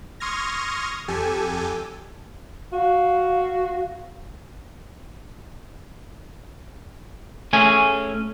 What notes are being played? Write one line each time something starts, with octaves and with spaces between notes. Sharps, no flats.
C6 C#6 D#6 F6 G#6 A#6
F2 G4 A4 G#5
F#4 F5
A3 C#4 G#4 G#5